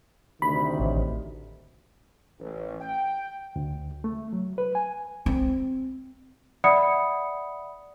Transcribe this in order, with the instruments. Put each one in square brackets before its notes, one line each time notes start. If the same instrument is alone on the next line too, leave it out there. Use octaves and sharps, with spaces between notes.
[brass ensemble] D2 C3 D#3 [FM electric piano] B5
[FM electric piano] A1
[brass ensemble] A1
G5
[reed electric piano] D2
A3
F#3
B4
G#5
[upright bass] C4
[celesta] D5 E5 F#5 B5 D#6 C#7